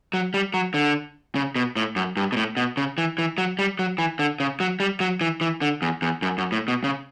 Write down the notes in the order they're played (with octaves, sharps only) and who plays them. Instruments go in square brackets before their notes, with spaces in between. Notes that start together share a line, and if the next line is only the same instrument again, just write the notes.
[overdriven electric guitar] F#3
G3
F#3
D3
C#3
B2
A2
F#2
G2
B2
A2
B2
C#3
E3
E3
F#3
G3
F#3
E3
D3
C#3
F#3
G3
F#3
E3
E3
D3
E2
E2
F#2
F#2
A2
B2
C#3